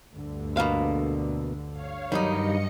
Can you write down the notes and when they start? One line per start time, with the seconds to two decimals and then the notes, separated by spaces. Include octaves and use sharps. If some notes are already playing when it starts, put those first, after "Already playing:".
0.13 D2 G2 D3
0.57 B2 A#3 F5
1.72 C#5 F5
2.12 G2 D#3 F#3 G3 D#4 D#5 C#7